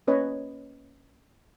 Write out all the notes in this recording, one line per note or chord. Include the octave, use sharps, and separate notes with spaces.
A#3 C#4 B4 C#5 D#5